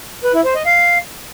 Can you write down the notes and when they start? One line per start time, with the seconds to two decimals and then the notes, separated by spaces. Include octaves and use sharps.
0.24 B4
0.34 E4
0.45 C5
0.55 D#5
0.66 F5